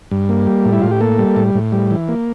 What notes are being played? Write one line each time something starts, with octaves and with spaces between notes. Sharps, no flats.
G2
A#3
G3
A2
E4
A2 F4
G4
A#3 A4
G3
A2
A2
G3
E3
A#3